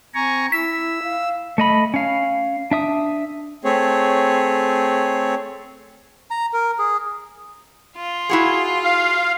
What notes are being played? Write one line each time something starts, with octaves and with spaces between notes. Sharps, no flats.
C4 G#5 A#5 C#6
E4 E6 B6
F5
A3 D#5 B5
C#4 F5
D4 E5 D#6
A3 C4 G#4 C#5
A#5
A#4
G#4
F4
E4 F#4 G#4
F5